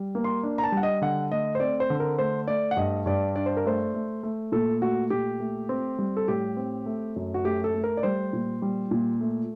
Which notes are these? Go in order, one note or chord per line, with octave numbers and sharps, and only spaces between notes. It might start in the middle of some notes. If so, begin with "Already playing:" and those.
Already playing: G3
A#3
C6
D4
A#5
A5
G3 F#5
D#5
D3 F#5
A3 D#5
C5
C4 D5
C5
D3
A#4
A3 C5
A3 D5
F#5
G2 D#5
G2 D5
D4 D5
C5
A#4
A3 C5
A3
A3
A#2 A4
A3 F#4
A#2 G4
A3
C4
G3
A4
A2 G4
C4
A3
F#2
F#4
A3 G4
A4
A3
A#4
D5
G3 C5
A#2
G3
A#2
A3